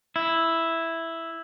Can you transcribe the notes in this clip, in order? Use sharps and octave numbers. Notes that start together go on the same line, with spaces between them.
E4